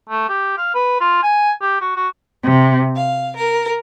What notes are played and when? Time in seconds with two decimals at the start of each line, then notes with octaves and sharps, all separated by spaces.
0.09 A3
0.29 G4
0.58 F5
0.74 B4
1.00 F4
1.23 G#5
1.61 G4
1.81 F#4
1.96 F#4
2.42 C3
2.95 F5
3.36 A#4